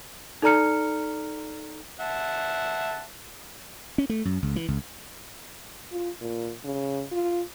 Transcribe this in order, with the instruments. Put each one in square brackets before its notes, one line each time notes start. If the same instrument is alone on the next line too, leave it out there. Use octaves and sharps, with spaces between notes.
[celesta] D#4 A4 D5 A#5 F6 C#7
[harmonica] E5 F#5 A5
[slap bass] C#4
A3
F#2
C#2
E3
C#2
[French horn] F4
A#2
C#3
F4